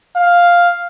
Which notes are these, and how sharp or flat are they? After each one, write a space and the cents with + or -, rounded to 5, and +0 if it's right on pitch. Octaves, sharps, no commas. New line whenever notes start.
F5 +5